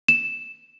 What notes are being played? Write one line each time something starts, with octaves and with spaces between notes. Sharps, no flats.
E7